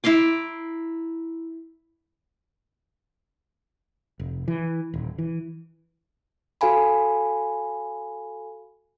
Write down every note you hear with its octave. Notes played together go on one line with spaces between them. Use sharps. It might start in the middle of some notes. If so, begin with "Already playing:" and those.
E4 A#5 C6 D6
F1
E3
D#1
E3
F#4 A4 F5 G#5 B5